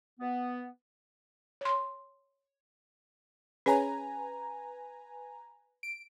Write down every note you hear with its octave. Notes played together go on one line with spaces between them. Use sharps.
B3
C#5 C6
C#4 G#4 B4 C#5 G#5 A#5
D7